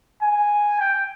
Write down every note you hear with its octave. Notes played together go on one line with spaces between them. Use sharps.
G#5
G5